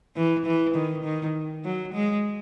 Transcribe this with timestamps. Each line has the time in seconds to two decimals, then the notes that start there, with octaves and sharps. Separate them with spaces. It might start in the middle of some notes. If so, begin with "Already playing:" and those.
0.16 E3
0.46 E3
0.75 D#3
1.04 D#3
1.65 F#3
1.94 G#3